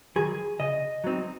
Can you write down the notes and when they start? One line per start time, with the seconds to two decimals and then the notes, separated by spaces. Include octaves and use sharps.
0.16 D#3 F#3 G#4
0.60 C#3 D#5
1.04 F#3 C4 D#4